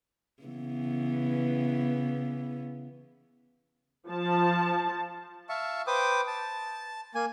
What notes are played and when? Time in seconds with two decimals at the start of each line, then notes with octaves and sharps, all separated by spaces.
0.43 C#3 E3 B3
4.07 F3 A5
5.49 E5 F5 A5 C#6
5.87 B4 C5 G5 D6 D#6
6.27 A5
7.15 A#3 G#5